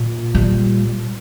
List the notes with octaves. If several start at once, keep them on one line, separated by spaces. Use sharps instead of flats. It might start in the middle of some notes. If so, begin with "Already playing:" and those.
Already playing: A#2
G3